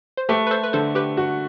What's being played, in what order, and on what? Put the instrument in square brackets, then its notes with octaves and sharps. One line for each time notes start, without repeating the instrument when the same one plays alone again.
[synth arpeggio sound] C5
[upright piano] A3 [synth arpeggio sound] G4 B4
[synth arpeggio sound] B4
A4 C5
B4
[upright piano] D3 [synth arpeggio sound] A4 C5
[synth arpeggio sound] G4 B4
[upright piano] F#4